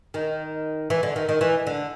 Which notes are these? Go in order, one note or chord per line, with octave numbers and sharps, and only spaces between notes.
D#3
E3
D3
D#3
D#3
E3
D3